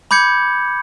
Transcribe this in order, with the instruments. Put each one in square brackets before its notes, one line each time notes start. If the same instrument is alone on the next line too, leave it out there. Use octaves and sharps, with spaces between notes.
[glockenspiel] B5 D6 G6 G#6 C#7